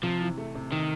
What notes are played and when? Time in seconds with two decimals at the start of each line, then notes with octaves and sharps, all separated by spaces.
0.03 C3 F3
0.21 E3
0.38 A3
0.55 C3
0.71 C3 D#3